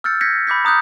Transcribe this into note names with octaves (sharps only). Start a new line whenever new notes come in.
E6 F6 G6 A6 C#7
G6 G#6 A#6 B6 C#7
B5 D6 G6 B6
A#5 D#6 F#6 G6